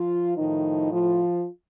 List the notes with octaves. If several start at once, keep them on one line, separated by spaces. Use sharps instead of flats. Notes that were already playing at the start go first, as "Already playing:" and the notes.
Already playing: F3 F4
A2 D#3 F3 D#4
F3 F4